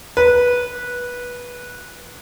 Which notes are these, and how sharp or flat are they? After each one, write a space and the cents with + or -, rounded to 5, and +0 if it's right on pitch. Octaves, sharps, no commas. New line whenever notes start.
B4 -15